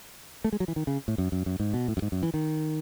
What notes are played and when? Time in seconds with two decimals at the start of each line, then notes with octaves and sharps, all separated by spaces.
0.44 A3
0.53 G#3
0.60 F#3
0.68 E3
0.76 D#3
0.87 C#3
1.08 A2
1.18 F#2
1.32 F#2
1.46 F#2
1.60 G#2
1.74 B2
1.88 A2
1.97 F#2
2.02 G#2
2.12 F#2
2.23 E3
2.34 D#3